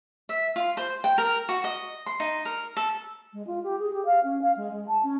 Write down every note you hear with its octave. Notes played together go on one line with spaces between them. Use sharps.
E5
F4
C5
G5
A#4
F#4
D#5
C6
D#4
A#4
A4
G#3
F4
G4
G#4
G4
F5
C#4
F5
G#3
G#3
A5
C#4